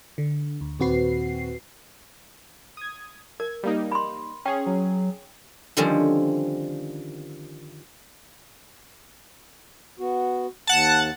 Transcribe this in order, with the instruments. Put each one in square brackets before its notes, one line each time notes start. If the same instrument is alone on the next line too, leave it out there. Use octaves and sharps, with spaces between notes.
[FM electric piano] D3
D2
D#2 A#2 C4 F#4 B4 C7
[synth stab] D#6 G#6
[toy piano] A#4 [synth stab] G#6
[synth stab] G3 A#3 D#4
[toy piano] B5 C6
[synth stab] C#4 G#4 [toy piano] G5
[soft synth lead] F#3
[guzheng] D3 D#3 F3 G3 C4 C#4
[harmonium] B3 F#4
[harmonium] D#2 [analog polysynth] F#5 A5